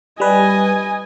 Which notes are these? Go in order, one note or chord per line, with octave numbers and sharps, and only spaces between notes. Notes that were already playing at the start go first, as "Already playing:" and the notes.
G3 B4 D#5 G#5